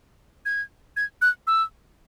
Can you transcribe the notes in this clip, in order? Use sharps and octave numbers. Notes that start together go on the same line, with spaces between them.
G#6
G#6
F#6
E6